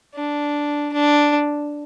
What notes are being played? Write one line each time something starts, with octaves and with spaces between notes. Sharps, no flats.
D4
D4